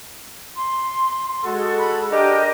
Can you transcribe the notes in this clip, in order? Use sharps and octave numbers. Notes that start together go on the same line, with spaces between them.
C6
G#3 F#4 A4
B5
D4 G4 A#4 D#5